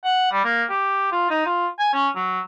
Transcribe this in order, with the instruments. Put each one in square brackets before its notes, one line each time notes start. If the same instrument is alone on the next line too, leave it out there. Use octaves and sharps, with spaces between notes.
[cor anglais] F#5
G3
A#3
G4
F4
D#4
F4
G#5
C#4
F#3